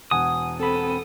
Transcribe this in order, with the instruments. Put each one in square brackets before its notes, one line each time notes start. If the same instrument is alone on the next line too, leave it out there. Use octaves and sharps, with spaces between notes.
[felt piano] E1 F#5 G#5 [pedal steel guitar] D#6
[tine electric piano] C4 B5 [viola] A4